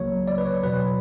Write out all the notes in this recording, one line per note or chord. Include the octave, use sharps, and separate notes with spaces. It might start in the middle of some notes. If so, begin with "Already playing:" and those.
Already playing: C#2 C#3 F#3 A#3 C#5
D5
B4
C#5
E2 B2 F#3 B4